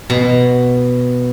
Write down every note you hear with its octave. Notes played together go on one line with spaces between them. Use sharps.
B2